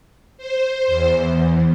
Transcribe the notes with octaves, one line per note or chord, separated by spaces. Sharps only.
C5
E2